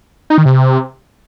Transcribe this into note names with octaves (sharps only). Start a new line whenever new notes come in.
D#4
D#3
C3